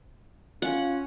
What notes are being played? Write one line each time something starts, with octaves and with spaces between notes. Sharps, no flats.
C#4 F4 F#5